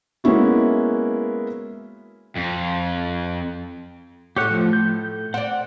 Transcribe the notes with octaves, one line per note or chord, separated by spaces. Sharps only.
G#3 A#3 B3 C#4 E4 F#4
F2
A2 A3 G4 C#5 F#5
F3
G6
C4 D5 F#5